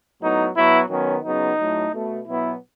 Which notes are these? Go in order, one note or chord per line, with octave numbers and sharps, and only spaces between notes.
A2 F#3 B3 D#4
B2 F#3 B3 E4
D#3 F#3 B3 C#4
C#3 F#3 B3 D#4
A2 F#3 A3
B2 A3
B2 F#3 B3 E4